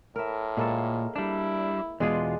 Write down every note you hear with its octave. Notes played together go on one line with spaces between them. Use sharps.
A2 A#4 E5
A#2 G#3 A#3 A4
G3 D4 E4
E2 B2 G#3 D4 F4 G#4